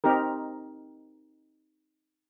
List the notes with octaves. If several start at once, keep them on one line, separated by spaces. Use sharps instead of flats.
C4 D#4 G4 A#4